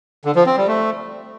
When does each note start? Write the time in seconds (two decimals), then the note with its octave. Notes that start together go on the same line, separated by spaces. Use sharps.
0.25 D3
0.36 F3
0.46 C4
0.57 G3
0.68 A3